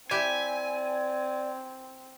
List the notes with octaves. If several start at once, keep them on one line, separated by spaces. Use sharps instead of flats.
C4 E4 G4 D5 E5 G#5